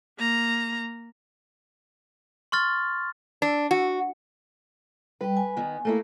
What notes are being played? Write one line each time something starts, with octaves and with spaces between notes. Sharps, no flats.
A#3 A#5
C6 C#6 F6 A6
D4
F#4
G3 B4 G5
G#5
D#3 B3
A3 A#3 E4